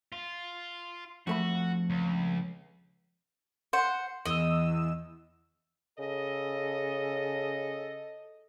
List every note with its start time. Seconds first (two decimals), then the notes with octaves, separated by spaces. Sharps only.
0.12 F4
1.27 F2 A3 F#4 B5
1.90 C#2
3.73 C5 F#5
4.26 E2 D#5 E6
5.99 C#3 A4 D#5